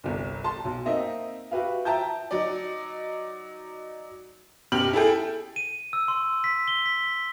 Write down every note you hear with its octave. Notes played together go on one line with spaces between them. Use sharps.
G1 C2
A5 C6
B1
A#3 C4 D#4 D#5 E5
F#4 G4 B4 E5 F5
E5 G5 A5 A#5 G6
F#3 D#4 D5
F#2 B2 G4 F6 F#7
E4 G#4 A4 G5
D#7
E6
C6
B6
G7
B6
B6